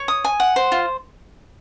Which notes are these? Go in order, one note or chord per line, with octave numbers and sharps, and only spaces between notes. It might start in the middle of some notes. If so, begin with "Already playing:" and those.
Already playing: C#5
D#6
G#5
F#5
C5
F4